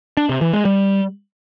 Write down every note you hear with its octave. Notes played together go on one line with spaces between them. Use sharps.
D4
C3
E3
G#3
G3